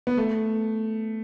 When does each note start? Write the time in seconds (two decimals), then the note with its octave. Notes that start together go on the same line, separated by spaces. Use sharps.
0.07 B3
0.17 A3